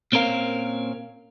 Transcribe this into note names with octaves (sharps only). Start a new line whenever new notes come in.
A#2 C4 C#4 A#4 F5